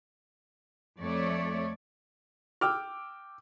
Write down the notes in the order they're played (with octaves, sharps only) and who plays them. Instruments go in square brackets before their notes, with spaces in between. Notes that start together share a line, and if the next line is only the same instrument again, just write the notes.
[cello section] F2 A3 C#5 D5
[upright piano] G5 D6 E6 F6